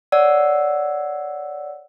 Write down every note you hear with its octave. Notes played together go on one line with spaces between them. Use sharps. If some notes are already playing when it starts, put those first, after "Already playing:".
C#5 D5 F#5 E6